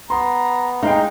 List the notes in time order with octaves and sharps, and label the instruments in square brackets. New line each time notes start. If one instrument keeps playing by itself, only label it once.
[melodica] B3 [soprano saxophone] A#5 [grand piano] C6
[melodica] G#3 [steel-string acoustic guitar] D#4 [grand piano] F5 G5